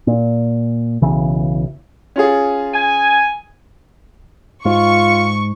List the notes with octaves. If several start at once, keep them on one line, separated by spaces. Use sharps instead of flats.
A#2
B1 C#3 E3
C#4 F4 G#4
G#5
G#2 F4 C#6